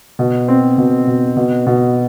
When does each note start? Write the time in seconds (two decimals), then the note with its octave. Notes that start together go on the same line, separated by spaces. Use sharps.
0.19 B2
0.48 C4
0.78 B2
1.07 B2
1.37 B2
1.67 B2